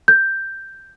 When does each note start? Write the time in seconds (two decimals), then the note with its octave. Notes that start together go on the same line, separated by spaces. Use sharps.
0.08 G6